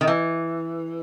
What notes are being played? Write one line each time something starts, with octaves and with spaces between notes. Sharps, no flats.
D#3
E3